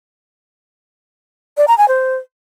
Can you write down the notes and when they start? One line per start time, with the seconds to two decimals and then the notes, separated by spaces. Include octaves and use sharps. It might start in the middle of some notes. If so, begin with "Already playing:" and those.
1.57 D5
1.68 A#5
1.78 G#5
1.88 C5